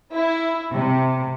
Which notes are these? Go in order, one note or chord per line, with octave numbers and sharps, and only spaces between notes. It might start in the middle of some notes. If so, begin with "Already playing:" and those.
E4
C3